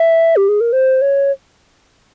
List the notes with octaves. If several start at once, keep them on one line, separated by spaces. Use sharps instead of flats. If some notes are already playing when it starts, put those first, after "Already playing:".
Already playing: E5
G4
G#4
A#4
C5
C#5